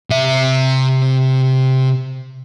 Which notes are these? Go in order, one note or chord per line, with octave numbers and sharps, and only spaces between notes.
C3 E5